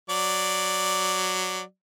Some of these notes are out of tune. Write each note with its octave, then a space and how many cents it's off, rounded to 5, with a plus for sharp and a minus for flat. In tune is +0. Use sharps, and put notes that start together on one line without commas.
F#3 +0 D5 +0